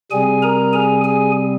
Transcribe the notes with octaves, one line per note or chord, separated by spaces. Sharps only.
C3 G3 C4 G#4 G#5
A#4 A#5
G#4 G#5
G#4 G#5